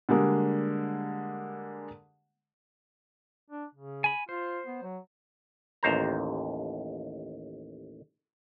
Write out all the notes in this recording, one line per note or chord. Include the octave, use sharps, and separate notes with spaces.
D3 G3 G#3 A#3
D4
C#3
G#5 B5
F4 C5
B3
F#3
A1 D#2 C5 A#5